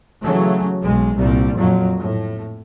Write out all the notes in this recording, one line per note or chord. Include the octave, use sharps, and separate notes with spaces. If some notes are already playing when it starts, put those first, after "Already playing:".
C#3 E3 F#3 A3
B1 G#3
C2 A#2 G3
F2 A#2 F#3
A2